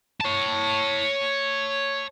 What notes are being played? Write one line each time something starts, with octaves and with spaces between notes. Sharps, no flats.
C#5 A5